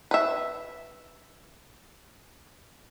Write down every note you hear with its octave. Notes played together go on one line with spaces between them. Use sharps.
B4 E5